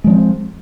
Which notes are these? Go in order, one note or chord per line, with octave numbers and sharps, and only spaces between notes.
F3 G#3 C4